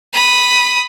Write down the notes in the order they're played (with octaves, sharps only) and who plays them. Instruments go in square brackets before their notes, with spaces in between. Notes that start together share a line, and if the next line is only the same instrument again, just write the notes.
[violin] B5 D#6